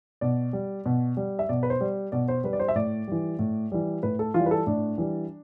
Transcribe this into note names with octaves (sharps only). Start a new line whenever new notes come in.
B2 D5
G3
B2
G3
E5
B2 D5
B4
C5
G3
B2 D5
C5
G3 B4
D5
C5
E5
A2 D5
E3 G3
A2
E3 G3
A2 B4
A4
E3 F4
G3
B4
A4
A2 D4
E3 G3